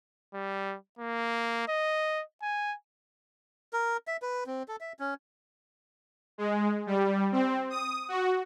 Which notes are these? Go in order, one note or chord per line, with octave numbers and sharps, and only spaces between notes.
G3
A#3
D#5
G#5
A#4
E5
B4
C4
A4
E5
C#4
G#3
G3
C4
D#6
F#4